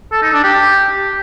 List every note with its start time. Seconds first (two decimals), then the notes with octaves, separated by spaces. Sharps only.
0.12 A4
0.22 D#4
0.33 D4
0.43 G4